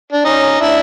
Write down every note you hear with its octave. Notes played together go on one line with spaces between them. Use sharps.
D4
C#4 D#4
D4 E4